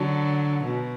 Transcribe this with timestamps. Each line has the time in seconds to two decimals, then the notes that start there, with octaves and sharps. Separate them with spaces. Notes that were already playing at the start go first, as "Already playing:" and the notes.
Already playing: D3 F#3
0.64 B2